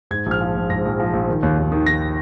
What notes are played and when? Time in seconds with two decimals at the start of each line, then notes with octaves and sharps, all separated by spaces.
0.11 G#2 G#6
0.26 A#1
0.31 F6
0.41 F3
0.55 A#1
0.70 G#2 A#6
0.85 A#1
1.00 F3
1.13 A#1
1.29 D#3
1.43 D#2
1.58 D#2
1.72 D#3
1.86 D#3 A#6